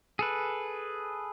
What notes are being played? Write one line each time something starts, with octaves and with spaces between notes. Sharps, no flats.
G#4 A4 B4